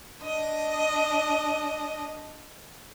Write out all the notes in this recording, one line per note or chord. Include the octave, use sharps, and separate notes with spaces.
D4 D#5